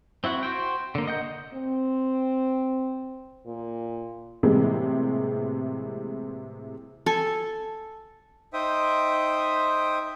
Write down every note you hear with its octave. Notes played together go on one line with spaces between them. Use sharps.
C4 E4 F#4 F#5
F#4 C5 G5
D3 A#3
D#5 F#5 G6
C4
A#2
A2 C3 E3 G3 G#3 A#3
A4 G#5
D#4 C5 E5 G5 D#6